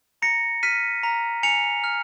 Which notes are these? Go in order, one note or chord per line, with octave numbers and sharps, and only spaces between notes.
A#5 A#6 C#7
F6 B6 D#7
A#5
G#5 C#7 F7
F6